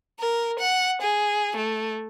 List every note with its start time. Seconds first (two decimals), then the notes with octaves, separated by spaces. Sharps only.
0.20 A#4
0.59 F#5
1.02 G#4
1.56 A3